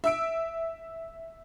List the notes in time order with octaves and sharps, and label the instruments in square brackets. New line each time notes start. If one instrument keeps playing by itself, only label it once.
[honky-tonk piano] E5 E6 D7